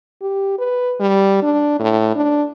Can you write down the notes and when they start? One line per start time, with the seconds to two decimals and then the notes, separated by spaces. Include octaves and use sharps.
0.22 G4
0.59 B4
1.00 G3
1.42 D4
1.80 A2
2.15 D4